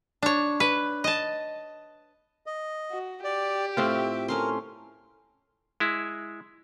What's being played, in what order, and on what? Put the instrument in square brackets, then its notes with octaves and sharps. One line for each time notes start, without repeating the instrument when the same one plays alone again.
[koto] D4 C#5
B4
D#5 A5
[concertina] D#5
[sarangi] F#4
[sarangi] G4 [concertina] D5
[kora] A2 C4 F4 [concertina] E5
[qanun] A3 C#4 C6 [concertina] A#4
[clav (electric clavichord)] G#3 E4